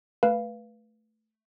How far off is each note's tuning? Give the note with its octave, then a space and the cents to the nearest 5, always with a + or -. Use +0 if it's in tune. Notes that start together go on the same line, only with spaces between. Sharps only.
A3 +0 B4 -10 F5 -15